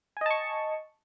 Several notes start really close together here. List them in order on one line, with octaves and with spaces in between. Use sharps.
G#5 D#5 A5 C#6